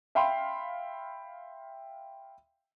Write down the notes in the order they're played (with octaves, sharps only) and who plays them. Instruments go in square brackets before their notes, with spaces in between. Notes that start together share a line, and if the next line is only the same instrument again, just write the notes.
[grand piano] E5 F5 G5 B5 C6